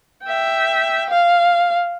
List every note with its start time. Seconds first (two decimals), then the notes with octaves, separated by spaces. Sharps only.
0.24 E5 G5
1.10 F5